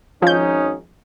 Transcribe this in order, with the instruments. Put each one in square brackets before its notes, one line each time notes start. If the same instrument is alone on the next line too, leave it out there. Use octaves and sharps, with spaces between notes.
[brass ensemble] G#1 C#4 D#4 [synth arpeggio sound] F3 G6